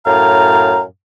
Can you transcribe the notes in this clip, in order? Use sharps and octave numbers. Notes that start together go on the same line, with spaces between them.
F#2 A2 F5 A#5